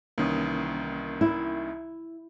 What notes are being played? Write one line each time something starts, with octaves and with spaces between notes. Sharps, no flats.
C2 D#3 E3 A#3 C#4 D#6
E4